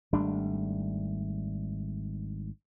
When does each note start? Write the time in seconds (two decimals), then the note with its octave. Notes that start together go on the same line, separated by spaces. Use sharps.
0.12 G#1 G3 A3 D4